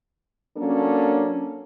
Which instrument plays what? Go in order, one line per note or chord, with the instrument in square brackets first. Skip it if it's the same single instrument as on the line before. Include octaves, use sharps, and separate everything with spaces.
[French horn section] F#3 A#3 C#4 D4 A4